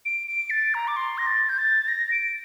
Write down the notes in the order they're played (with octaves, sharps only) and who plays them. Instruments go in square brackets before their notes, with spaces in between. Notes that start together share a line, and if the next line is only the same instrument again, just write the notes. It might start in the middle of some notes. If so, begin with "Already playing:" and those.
[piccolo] D7
D7
A6
A#5
D6
C6
A#6
A6
G6
A6
A#6
D7